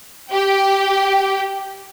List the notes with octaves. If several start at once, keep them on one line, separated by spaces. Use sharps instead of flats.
G4 G5